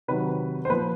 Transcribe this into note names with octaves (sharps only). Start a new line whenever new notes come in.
C3 D#3 F#3 B4
C5
A#2 F3 B4